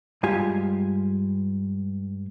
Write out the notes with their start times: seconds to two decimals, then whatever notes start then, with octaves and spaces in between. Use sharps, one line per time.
0.23 G2 G#3 F4 G4 G#5